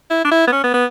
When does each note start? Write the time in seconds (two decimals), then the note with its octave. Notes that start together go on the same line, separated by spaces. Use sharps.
0.10 E4
0.25 D4
0.31 E4
0.47 B3
0.52 C#4
0.63 B3
0.74 B3